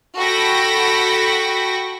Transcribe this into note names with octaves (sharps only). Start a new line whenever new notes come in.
F#4 A4 G5 B5 A#6 B6